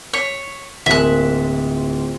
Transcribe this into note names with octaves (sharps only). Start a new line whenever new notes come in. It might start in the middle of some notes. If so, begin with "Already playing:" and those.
C#5 B6
D1 A#2 F3 G#3 E5 F#6